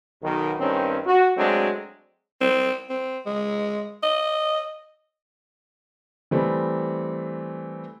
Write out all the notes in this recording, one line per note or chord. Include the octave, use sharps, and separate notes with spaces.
B1 D#3
G2 D#3 C4 C#4
F#4
F#3 G#3 A3 C4 D4
C4
C4
G#3
D#5
E3 G3 A3 C4